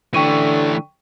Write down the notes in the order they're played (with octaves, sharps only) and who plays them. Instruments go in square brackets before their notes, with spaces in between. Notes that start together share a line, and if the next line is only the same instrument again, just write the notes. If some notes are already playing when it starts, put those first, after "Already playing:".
[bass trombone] D3 [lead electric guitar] E3 A3 [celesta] G5 C#6 D#7